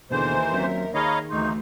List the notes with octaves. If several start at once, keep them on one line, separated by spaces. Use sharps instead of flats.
D#2 B2 D3 E3 G#4 A#4 C5
F#3 C4 C#4 E5
D#3 G#4 C#5 D#5 F5 A#5 B5 C#6
D2 E3 A#3 D#4 C6 C#6 G6